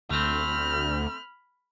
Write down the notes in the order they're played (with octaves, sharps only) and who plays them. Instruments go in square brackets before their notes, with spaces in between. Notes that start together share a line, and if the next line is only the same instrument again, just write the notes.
[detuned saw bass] D2 [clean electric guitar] A3 C4 [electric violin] B5 F6